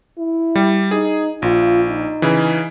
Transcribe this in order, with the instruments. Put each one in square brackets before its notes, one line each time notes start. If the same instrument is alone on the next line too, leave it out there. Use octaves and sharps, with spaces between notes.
[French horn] E4
[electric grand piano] G3
[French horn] D#4 [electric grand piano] G#4
[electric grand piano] A#1 [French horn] F4
[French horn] D#4
[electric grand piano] C#3 E3